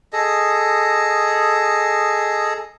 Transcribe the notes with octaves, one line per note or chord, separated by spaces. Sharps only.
G#4 A4 D#5